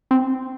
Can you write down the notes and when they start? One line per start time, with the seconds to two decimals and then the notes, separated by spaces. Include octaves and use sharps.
0.11 C4